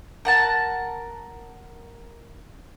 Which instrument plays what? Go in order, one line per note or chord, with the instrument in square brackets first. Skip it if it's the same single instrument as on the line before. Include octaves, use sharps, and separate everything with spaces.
[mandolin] A#4 F#5 A5